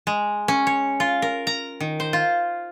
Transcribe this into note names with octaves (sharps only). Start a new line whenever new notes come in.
G#3
C#4
C#5
F4
A#4
A#5
D#3
C5
F4